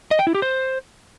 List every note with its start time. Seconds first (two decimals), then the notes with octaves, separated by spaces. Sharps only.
0.11 D#5
0.19 G5
0.27 E4
0.35 G4
0.42 C5